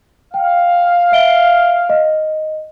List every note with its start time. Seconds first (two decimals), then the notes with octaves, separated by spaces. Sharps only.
0.34 F5 G5
1.12 E5 D7 G7
1.90 D#5